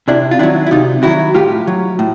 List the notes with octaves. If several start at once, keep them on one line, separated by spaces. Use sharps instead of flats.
C3 D4 E4
F4
D#3 F#3 D4 E4
E4
C3 D#4 F4
D#3 F#3 E4 F#4
A2 F4 G4
F#3
A2